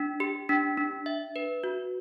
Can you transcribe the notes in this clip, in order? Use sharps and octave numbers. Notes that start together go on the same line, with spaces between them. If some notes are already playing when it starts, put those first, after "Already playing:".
Already playing: D4
G4
D4
D4
E5
B4
F#4